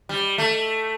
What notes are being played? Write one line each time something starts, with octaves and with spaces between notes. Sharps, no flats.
G3
A3